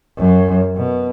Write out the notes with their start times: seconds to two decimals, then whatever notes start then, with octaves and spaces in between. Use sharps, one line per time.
0.17 F#2
0.76 B2